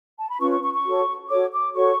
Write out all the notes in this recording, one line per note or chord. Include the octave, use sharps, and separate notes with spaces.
A5
B5
C#4 F4 B4 C#6
C#6
C#6
C#6
F#4 A4 C#5
F#4 A4 C#5 D6
D6
F#4 A4 C#5 C#6